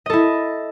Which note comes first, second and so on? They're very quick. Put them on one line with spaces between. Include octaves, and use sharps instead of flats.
D#5 A4 E4